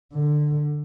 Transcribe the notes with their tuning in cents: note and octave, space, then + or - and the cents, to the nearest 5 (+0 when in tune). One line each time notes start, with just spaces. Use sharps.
D3 +15